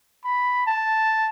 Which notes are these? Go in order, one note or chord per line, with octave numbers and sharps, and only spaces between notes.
B5
A5